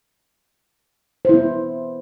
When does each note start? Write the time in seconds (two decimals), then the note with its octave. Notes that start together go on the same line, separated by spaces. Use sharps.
1.25 C5
1.29 E4
1.34 B3